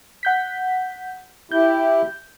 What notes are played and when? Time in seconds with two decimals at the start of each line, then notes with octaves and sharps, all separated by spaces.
0.23 F#5 G6 B6
1.51 E4 G4 G6